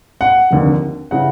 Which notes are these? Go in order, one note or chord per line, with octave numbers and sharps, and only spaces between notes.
F#5
F1 D#2 D3
C#3 E3 F#5